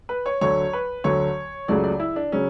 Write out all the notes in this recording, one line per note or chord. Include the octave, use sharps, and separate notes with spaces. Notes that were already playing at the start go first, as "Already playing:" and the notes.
B4
C#5
D2 D3 F#3 C#5
B4
D2 D3 F#3 C#5
C#2 C#3 F#3 A3 D5
D5
E4
D4
C#3 F#3 C#4